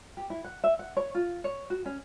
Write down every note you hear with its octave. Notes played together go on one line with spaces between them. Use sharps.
G4
E4
F#5
E5
F#5
C#5
F4
C#5
F#4
C#4